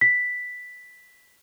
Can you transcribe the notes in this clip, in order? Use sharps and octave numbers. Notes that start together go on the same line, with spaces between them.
B6